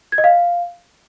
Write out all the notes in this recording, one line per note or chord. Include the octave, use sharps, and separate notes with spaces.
G#6
D#5
F5